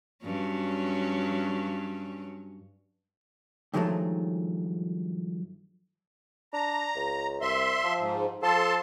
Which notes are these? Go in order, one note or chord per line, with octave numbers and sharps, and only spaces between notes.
G2 F#3 C#4
G2 D#3 F3 F#3 G#3 A3
D4 A#5
C#2
C2 E5 C6
F3
G#2
F3 A4 A5 C6